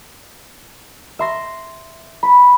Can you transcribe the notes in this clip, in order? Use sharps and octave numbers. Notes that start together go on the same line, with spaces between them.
E5 C6 A#6
B5